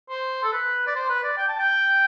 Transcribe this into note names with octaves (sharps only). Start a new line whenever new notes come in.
C5
A4
B4
D5
C5
B4
D5
G5
A5
G5